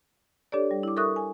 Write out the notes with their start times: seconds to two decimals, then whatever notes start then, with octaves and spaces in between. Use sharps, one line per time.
0.52 D4 G4 A4 C#5 D5
0.71 G3
0.83 E4 D6
0.97 A4 A#4 E5 C#6 D#6 F#6
1.16 G#5